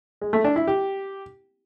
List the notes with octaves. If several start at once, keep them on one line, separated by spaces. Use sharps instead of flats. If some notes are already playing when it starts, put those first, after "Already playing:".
G#3
A3
D4
E4
G4